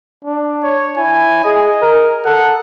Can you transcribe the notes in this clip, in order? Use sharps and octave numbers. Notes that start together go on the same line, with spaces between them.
D4
C#5
E4 G#5
G#4 D#5
A#4
A4 F#5